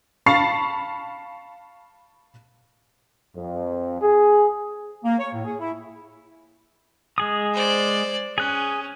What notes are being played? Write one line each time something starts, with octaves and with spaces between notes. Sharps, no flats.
F5 A5 B5 C#6 A6 C7
F2
G#4
A#3
C#5
A2
G#4
E4
G#3 G#4 D#6
C5 D5
C#4 G#4 F#6